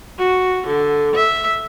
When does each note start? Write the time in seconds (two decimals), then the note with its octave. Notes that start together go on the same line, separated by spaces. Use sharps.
0.19 F#4
0.67 D3
1.15 E5